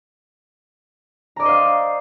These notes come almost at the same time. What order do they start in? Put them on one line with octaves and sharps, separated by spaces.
A#5 D5 D#5 C5 F5